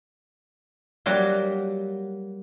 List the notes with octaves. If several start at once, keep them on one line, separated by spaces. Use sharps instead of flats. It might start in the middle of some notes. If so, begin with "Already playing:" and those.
F#3 G3 A#3